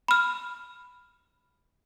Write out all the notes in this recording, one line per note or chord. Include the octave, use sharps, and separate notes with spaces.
B5 F6